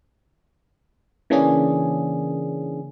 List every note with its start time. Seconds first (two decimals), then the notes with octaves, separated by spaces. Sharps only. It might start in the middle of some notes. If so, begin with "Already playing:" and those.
1.30 C#3 E3 A#3 C#4 D4 G#4